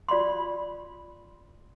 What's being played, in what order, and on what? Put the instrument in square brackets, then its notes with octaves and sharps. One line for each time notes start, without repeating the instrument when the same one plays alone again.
[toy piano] F4 D5 B5 C6